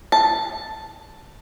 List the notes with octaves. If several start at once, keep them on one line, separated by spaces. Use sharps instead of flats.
A5